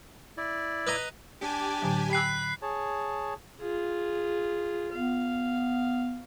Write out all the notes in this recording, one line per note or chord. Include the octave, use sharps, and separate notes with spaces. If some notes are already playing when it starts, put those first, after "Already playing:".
E4 D5
B4 D#5 A#5
D4 G4 G#5
A2 D3 F#3
G5 B5 E6 F#6 C7
G#4 C#5 A5
F4 G#4
B3 F5